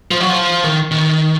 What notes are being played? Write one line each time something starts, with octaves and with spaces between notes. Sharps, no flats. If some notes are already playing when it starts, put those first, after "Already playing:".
F3
F#3
F3
D#3
D#3